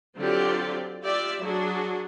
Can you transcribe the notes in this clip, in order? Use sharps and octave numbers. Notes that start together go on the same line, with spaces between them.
D3 F#3 C4 F4 G4 D5
F4 G4 D5 E5
F#3 D4 F#4 G#4